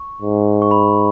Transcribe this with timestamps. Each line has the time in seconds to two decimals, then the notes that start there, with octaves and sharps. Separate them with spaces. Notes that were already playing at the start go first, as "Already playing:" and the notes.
Already playing: C#6
0.22 G#2
0.62 C#6
0.71 B5